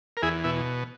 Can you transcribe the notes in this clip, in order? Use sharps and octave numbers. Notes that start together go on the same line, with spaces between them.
A#4
E2 E4 G#4
B2 E4